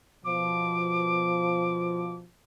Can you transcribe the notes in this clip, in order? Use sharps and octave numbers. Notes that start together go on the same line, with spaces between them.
B2 F3 D6